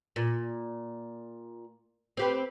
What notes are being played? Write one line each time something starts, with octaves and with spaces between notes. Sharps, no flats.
A#2
C4 G4 B4